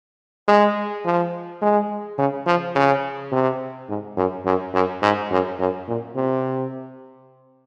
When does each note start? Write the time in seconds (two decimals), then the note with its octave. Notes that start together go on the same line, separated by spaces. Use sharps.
0.48 G#3
1.05 F3
1.62 G#3
2.19 C#3
2.47 F3
2.75 C#3
3.32 C3
3.89 G#2
4.17 F#2
4.46 F#2
4.74 F#2
5.02 G#2
5.31 F#2
5.60 F#2
5.88 A#2
6.16 C3